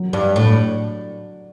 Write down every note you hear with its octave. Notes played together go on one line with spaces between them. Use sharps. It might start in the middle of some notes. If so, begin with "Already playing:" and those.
Already playing: F#3
G2
A2